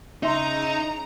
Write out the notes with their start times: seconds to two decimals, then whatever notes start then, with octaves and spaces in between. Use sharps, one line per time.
0.23 C#3 D#4 E5 A#5 C6